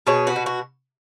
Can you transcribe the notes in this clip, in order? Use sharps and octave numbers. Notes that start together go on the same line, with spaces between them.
B2 G#4 C#5
F#4 B4
B2
F#4